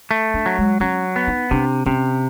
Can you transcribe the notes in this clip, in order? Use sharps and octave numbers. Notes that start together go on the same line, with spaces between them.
A3
D4
F#3
G#3
F#3 C#4
B3
D#4
C3 D4
C3 C#4